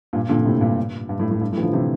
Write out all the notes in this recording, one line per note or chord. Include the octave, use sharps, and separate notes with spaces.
G2 A#2
A#2 D3
D3
A2 C3
G2 A#2
G2
A2
A2
G2
A2
E3
D3 F3
C3 E3